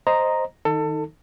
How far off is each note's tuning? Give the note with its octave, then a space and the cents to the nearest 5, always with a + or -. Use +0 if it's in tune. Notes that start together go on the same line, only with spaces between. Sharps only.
C5 +0 D#5 +0 A#5 +0
D#3 +0 D#4 +10 A4 +25